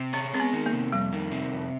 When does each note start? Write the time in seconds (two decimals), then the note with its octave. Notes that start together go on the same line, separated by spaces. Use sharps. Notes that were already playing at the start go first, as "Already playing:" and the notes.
Already playing: C3
0.13 C4 C#4
0.34 G#3 C4
0.40 B3
0.53 D#3
0.66 A#3
0.73 C3
0.92 F2 G3
1.12 D#3
1.32 C3
1.53 F2